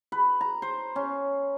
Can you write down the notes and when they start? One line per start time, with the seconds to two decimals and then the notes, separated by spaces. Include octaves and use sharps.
0.12 B4
0.41 A#5
0.62 C5
0.96 C#4